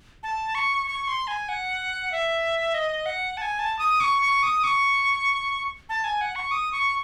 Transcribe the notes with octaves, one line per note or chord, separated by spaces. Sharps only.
A5
C#6
C#6
C6
G#5
F#5
E5
D#5
F#5
A5
G#5
A5
D#6
C#6
C#6
D#6
C#6
A5
G#5
F#5
C#6
D#6
C#6